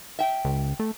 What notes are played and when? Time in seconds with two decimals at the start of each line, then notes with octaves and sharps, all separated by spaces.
0.19 E5 G5
0.45 C#2
0.79 A3